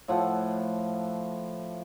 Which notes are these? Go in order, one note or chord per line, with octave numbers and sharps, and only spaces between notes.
A2 F3 F#5